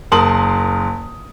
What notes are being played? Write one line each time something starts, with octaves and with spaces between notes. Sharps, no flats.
F#1 A#4 A5 C6 D#6 F#7